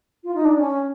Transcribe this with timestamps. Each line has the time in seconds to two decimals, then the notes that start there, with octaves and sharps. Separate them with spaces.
0.24 F4
0.35 D#4
0.45 D4
0.56 C#4